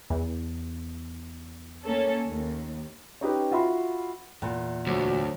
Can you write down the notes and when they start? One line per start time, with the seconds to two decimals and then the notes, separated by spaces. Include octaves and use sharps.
0.10 E2
1.84 A#3 C#4 A4
2.27 D#2
3.21 C#4 D#4 G4 B4
3.51 F4 F#4 E5 B5 C6
4.42 E2 A#2
4.87 D2 F#3 F#4 C5